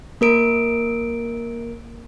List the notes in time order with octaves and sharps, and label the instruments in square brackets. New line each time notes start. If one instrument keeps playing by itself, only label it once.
[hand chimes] A#3 A#4 D7